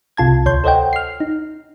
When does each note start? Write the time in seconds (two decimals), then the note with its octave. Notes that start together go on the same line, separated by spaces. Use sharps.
0.17 C2 C3 F4 A5 G#6
0.46 D2 C#5 C6 G6
0.64 A4 C5 C#5 D#5 F#5 G5
0.93 F6 C7
1.20 D#4